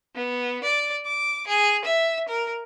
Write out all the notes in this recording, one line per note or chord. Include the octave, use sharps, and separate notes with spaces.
B3
D5
D6
G#4
E5
A#4